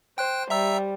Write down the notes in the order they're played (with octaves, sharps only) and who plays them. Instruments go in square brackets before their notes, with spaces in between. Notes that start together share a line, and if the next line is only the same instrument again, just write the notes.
[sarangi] C5 [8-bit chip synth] G5 F#6
[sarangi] G3 [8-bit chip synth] E5 A#5 E6